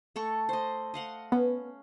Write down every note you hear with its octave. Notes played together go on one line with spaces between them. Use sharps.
A3 A4 C#6
C5 D#5
D#5 F5 F#5
B3 C#4